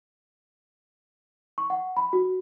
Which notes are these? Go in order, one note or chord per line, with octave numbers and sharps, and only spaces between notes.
C#6
F#5
B5
F#4